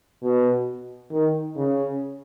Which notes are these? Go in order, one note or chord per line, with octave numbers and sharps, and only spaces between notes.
B2
D#3
C#3